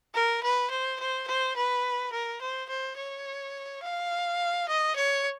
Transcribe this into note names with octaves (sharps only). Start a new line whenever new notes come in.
A#4
B4
C5
C5
C5
B4
A#4
C5
C5
C#5
F5
D#5
C#5